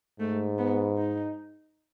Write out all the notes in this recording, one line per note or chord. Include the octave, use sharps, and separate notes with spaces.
G#2 A3
B3
D#4